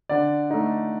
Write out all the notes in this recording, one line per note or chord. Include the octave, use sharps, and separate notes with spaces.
D3 D5
A3 D#4